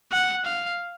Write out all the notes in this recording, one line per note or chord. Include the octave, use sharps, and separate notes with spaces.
F#5
F5